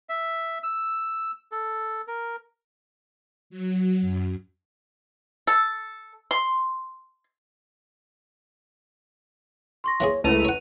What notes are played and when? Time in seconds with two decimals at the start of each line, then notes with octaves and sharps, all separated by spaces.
0.09 E5
0.63 E6
1.52 A4
2.08 A#4
3.50 F#3
4.01 F#2
5.47 A4
6.31 C6
9.84 C6 C#6 A#6
10.00 E3 A#3 G#4 C#5
10.24 C#2 A3 E4 B4 A#5 D#7 F7
10.45 C#5 F#5